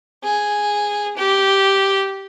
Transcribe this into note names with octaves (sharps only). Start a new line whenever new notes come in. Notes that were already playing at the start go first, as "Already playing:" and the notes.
G#4
G4